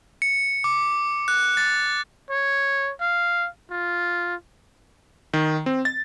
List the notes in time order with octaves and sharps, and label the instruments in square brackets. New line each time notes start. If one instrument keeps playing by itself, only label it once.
[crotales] C#7
D6
F#6
A6
[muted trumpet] C#5
F5
F4
[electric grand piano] D#3
C4
A6